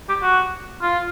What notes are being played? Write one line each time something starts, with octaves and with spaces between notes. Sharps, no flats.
G4
F#4
F4